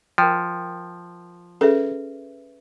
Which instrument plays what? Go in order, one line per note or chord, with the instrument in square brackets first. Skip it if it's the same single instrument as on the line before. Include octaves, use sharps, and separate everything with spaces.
[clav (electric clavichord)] F3 [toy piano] A#4 G5
[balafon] C#4 G#4 A4 [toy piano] B4 E5